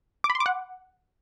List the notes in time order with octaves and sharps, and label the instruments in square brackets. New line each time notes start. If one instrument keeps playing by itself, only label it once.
[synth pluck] D6
B5
C6
D6
F#5